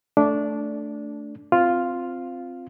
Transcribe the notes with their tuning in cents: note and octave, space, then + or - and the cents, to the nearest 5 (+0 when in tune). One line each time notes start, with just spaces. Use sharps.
A3 +0 D4 -15
C4 -5 F4 +0